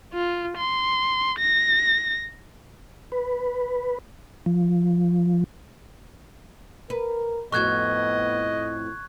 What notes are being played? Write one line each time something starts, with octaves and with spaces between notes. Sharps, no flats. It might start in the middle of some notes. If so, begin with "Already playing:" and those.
F4
C6
A#6
B4
F3
A#4 B4
F2 A2 B3 F#4 D#5 C#6 F#6 G#6